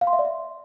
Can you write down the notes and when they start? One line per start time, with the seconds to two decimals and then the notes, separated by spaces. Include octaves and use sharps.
0.01 F5
0.07 C6
0.13 E5
0.19 D5
0.25 E5